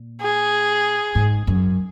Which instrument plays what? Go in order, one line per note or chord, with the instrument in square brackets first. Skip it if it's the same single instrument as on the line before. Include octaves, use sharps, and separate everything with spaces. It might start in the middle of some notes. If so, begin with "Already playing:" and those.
Already playing: [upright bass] A#2
[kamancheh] G#4
[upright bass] G#2
F#2